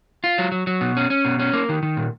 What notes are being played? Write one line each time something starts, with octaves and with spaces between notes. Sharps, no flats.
F4
F#3
F#3
F#3
B2
C#4
C#4
B2
C#4
A#3
D#3
D#3
A#2